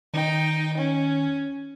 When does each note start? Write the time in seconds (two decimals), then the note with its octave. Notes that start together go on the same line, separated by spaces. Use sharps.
0.14 D#3 D#4 G5
0.77 C#4